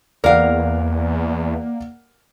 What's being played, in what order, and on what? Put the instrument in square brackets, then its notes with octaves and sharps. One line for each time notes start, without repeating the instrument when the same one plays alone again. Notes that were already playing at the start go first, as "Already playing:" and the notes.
[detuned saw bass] E2 [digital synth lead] A#3 [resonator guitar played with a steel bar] A#4 F5 [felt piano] D5 F#5